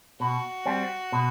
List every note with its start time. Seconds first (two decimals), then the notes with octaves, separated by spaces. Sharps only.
0.20 B2 F#4
0.66 G3 C4
1.12 B2